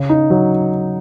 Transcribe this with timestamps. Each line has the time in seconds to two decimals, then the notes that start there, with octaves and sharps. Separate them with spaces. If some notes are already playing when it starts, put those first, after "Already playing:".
Already playing: C#3
0.10 D#4
0.30 F#3